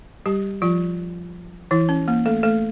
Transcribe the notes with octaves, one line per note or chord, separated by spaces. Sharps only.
G3 G4
F3 F4
E3 E4
C#4
A#3
A3 A4
A3 A4